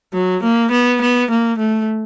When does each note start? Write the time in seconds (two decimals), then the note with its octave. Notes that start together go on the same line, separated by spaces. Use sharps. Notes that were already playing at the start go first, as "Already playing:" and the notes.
0.13 F#3
0.43 A#3
0.71 B3
1.01 B3
1.30 A#3
1.59 A3